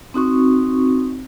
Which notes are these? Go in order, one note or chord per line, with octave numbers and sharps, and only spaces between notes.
C4 D#4 F#4 C#6